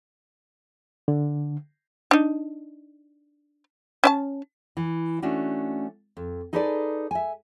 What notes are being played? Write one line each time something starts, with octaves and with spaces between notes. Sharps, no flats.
D3
D4 D#4
C#4 D5 A5
E3
A3 C#4 D4 F#4
F2
D#4 G#4 A4 B4 C5 D5
E5 G#5